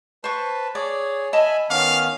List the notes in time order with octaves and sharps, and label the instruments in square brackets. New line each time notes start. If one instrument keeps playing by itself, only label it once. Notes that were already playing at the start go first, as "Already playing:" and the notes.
[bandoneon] B4 A5 [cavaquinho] C5 C#6
[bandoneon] G#4 C#5 [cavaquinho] D5 D6
[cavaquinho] D#5 A5 [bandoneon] E5 G#5 B5
[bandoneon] D#3 B3 C#4 [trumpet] F5 [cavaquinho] D6